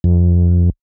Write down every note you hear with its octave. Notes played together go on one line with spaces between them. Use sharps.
F2